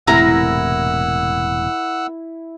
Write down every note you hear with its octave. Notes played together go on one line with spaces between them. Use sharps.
E1 A2 C3 E4 A#4 F#5 A#5 E6